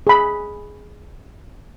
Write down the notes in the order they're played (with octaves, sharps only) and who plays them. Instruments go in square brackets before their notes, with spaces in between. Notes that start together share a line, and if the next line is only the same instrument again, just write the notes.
[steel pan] G#4 B5